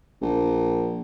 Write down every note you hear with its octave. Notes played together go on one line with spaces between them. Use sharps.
A#1